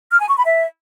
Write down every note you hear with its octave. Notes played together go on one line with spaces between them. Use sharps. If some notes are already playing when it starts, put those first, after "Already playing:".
F6
G#5
C#6
B5
E5